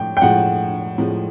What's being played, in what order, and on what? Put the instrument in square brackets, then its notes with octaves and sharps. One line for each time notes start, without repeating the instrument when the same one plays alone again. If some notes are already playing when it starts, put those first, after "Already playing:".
Already playing: [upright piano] A2 F3 [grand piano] G5
[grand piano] G5
[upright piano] A2 F3 G#3 [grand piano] F#5
[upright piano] A2 F3 G#3